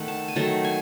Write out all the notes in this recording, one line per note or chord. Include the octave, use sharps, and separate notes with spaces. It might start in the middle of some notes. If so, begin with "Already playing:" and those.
Already playing: D#3 A3 F#5
A5
G#5
D#3 F#3 A3 A5
G#5